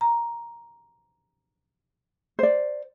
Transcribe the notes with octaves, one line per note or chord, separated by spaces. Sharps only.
A#5
C5 D5